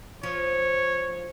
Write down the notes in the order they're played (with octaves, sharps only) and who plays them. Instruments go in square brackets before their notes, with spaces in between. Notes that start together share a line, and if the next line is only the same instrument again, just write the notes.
[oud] F3 [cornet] C#5